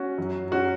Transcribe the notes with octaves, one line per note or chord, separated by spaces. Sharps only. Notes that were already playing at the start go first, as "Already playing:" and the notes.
Already playing: C#4 F#4
F#2 F#3
C#4 F#4